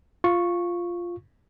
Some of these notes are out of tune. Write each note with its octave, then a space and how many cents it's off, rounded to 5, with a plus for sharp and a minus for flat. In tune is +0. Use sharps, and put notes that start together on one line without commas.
F4 +0 C#6 -5